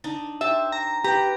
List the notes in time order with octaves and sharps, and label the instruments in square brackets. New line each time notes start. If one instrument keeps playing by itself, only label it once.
[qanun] D4 D#4
[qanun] G4 C5 A5 [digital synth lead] E5
[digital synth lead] A#5
[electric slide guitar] G4 [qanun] B4 G5 [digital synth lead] A#5